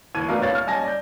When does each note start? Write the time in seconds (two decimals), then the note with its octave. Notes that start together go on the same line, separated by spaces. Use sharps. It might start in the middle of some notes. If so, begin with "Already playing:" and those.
0.14 E1 D#2 E3 G#6 D#7
0.28 A3 B3 D4 F#4 A#4 F5
0.42 C2 C#5 F5 A6
0.55 F6
0.67 G3 C#4 D#5 G#5 A5 A#6
0.84 D5 G6